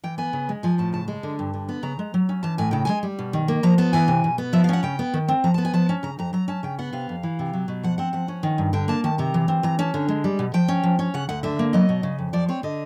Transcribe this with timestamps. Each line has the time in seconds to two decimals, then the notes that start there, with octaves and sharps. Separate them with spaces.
0.04 E3 G5
0.18 B3 G#5
0.33 C#3
0.49 G#3
0.63 F3 G#5
0.78 A2 A5
0.93 C#3 A5
1.08 G#3 A5
1.23 D3
1.39 G2
1.54 D3
1.69 B3
1.83 C#3 A#5
1.99 G#3
2.14 F#3
2.29 C#4
2.43 E3 A5
2.58 A2 G#5
2.71 C#3 G5
2.85 G#3 G#5
3.03 G3
3.19 B2
3.33 D#3
3.48 A#3
3.63 F3 A#5
3.78 B3 A5
3.93 E3 G#5
4.08 C3
4.24 B2
4.38 B3
4.53 F3 E5
4.64 F5
4.69 C#4 F#5
4.83 C#3 G5
4.99 B3
5.14 D#3
5.28 C4
5.44 F3 A#5
5.54 B3 A5
5.65 G#5
5.73 F3 A5
5.89 C#4
6.03 C#3 A#5
6.19 F2 A#5
6.33 F#3 A#5
6.48 C#4 A5
6.63 C#3 G5
6.79 B3 F#5
6.93 C3 F5
7.09 F2
7.23 E3
7.39 C3
7.53 F#3
7.68 B2
7.83 F3 F#5
7.98 C4 F#5
8.13 F3 F#5
8.28 C#4
8.43 D#3
8.58 G2
8.73 D3 G5
8.88 A#3 A5
9.04 D#3 A5
9.18 C3 A#5
9.34 E3
9.48 C4
9.63 E3 A#5
9.79 C#4 A5
9.94 D3
10.08 G#3
10.24 G3
10.39 B2
10.54 F3 G5
10.68 C#4
10.83 F3
10.99 C#4
11.14 C#3 F#5
11.29 D2 F#5
11.43 D3 E5
11.59 A#3
11.73 F#3 D#5
11.89 B2
12.03 C#3
12.18 F2
12.33 F3 D5
12.48 C4 C#5
12.63 D3 D#5